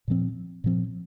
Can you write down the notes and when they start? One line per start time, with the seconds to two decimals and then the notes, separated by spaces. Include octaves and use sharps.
0.08 A#2 F3 C4
0.64 A#2 F3 C4